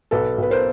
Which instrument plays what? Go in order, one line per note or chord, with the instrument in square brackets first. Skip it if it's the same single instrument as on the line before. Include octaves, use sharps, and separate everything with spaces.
[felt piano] B1 A4 B4
B1
B4
A#4 C5